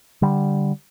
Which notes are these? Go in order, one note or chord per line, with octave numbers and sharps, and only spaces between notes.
D3 G3